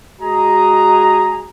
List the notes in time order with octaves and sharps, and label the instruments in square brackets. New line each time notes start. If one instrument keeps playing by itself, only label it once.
[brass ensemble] G#3 F#4 G#4 D#5 A#5